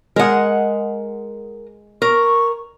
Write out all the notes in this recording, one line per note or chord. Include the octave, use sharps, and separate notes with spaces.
G#3 G#4 A#4 F#5
A#4 C#6